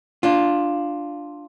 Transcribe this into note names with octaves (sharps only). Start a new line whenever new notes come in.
D4 F4